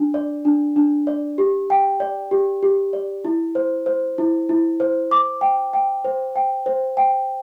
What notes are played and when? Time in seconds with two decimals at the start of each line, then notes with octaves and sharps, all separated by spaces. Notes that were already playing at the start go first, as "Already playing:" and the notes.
Already playing: D4
0.14 D5
0.45 D4
0.76 D4
1.07 D5
1.38 G4
1.70 G5
2.00 D5
2.31 G4
2.63 G4
2.93 D5
3.25 E4
3.55 C5
3.86 C5
4.18 E4
4.49 E4
4.80 C5
5.11 D6
5.41 G5
5.73 G5
6.04 C5
6.36 G5
6.66 C5
6.97 G5